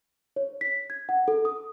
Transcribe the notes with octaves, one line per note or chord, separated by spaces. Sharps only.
C#5
B6
G#6
F#5
A4
D#6